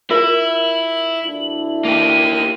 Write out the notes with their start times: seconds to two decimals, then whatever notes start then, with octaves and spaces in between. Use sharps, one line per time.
0.10 E4 F4 A#4 E5 F#7
1.23 D2 D4 E4
1.85 A#3 G4 D#7